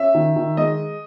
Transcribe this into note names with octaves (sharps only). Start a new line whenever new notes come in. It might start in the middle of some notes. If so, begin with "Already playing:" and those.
Already playing: C#4 E5
D#3
D#3
G#3 D#5